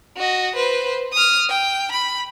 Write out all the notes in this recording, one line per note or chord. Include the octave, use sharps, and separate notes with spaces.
F#4 D#5
B4 C5
D#6 F6
G5
B5